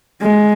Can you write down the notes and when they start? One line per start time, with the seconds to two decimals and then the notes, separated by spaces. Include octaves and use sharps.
0.22 G#3